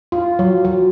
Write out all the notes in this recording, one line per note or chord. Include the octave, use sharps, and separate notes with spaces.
F4
F#3
F#3